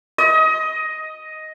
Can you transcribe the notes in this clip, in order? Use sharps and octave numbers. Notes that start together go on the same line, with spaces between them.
D#5